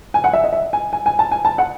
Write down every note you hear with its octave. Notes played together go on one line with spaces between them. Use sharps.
G#5
F#5
E5
D#5
E5
G#5
G#5
G#5
A5
G#5
A5
F#5